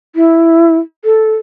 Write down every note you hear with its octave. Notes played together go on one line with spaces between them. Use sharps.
E4
A4